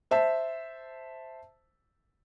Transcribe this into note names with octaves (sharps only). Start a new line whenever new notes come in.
C5 E5 A5